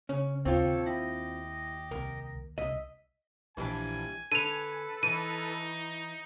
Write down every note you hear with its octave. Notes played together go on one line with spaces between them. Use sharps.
C#3 C#4
D#2 C4 F4 G4 A4 C#5
E4 G4 D#5
C2 A#4
C2 D#5 E5
A#1 E3 G3 D4 G#5
D3 D4 A4 B4 D#7 F7
E3 D#4 D#7